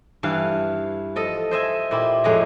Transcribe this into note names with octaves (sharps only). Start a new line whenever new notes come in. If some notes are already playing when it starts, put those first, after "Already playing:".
G2 E3 F5
F3 A4 D#5
C5 D#5 E5 G#5
A#2 E4 G4
F2 A2 G#3 D#5 A#5